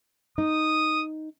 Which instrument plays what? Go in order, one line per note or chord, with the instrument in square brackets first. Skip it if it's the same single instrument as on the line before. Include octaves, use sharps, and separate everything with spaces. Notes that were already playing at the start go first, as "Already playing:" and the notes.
[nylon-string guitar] D#4 [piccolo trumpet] D#6